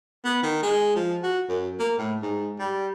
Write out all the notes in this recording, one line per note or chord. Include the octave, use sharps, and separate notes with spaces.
B3
D#3
G#3
F3
F#4
F#2
A#3
A2
G#2
G3